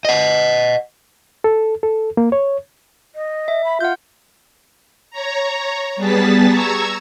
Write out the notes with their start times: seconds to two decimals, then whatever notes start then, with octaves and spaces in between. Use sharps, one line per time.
0.05 D#5 F#5
1.44 A4
1.83 A4
2.17 A#3
2.32 C#5
3.15 D#5
3.48 E5
3.64 B5
3.81 F4 F#5 G6
5.11 C#5 A#5
5.96 G3 B3 G#4 A5 A6 B6
6.48 A#5 C#6 E6 G#6